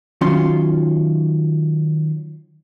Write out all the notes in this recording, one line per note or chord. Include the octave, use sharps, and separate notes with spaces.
D#3 F#3 C#4 F4 C6